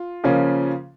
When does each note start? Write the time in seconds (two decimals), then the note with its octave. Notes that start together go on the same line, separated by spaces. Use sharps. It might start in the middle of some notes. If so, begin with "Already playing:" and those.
Already playing: F4
0.24 C#3 F3 A#3 C#4